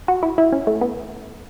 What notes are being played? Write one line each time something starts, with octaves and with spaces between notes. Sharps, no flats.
F#4
E4
E4
C#4
A3
B3